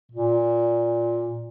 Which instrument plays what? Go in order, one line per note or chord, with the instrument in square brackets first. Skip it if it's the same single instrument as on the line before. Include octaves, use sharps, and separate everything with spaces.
[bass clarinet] A#2